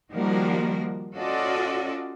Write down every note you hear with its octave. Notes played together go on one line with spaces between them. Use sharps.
D#3 F3 G3 A#3 F#4 A#4
C#4 F4 F#4 A4 D5 D#5